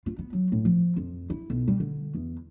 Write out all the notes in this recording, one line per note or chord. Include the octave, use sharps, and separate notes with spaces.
F4
B3
F#3
A2
F3
F2
E4
B1
G3
D3
E2